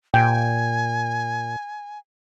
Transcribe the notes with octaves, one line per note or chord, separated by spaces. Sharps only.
A#2 G5 G#5